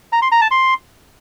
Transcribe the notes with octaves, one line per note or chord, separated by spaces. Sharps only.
A#5
C6
A#5
A5
C6